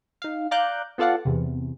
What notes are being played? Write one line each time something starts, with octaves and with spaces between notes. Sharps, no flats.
D#4 F5
D5 F5 A#5 D6 F#6 G6
B3 F4 A4 D5 F5 F#5
E2 C3